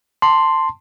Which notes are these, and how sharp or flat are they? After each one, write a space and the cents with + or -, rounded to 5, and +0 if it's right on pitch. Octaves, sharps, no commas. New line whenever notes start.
A5 +20 C6 +0